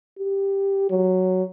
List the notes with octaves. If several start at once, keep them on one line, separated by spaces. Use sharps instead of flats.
G4
F#3